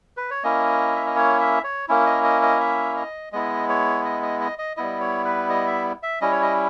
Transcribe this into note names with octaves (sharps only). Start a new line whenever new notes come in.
B4
C#5
A#3 C#4 E4 D#5
E5
D#5
C#5
E5
C#5
A#3 C#4 E4
D#5
D#5
D#5
E5
D#5
G#3 B3 E4 D#5
C#5
D#5
D#5
D#5
D#5
G3 B3 E4 D#5
C#5
B4
D#5
E5
E5
G3 C#4 E4 D#5
C#5
D#5